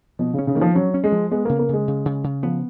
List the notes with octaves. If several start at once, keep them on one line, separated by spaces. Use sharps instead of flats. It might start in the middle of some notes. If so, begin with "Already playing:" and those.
B2 F3
C#3
C#4
C#3
D#3 A#3
F3
F#3 C#4
C#4
G#3
F3
G#3 B3
C#3 A#3
A#3
C#3 G#3
C#3
C#3
C#3
F3 B3